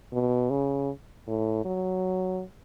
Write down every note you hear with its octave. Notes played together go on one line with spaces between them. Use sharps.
B2
C#3
A2
F#3